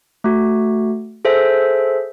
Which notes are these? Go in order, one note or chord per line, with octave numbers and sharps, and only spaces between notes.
A3 F#4
G#4 A4 C5 E5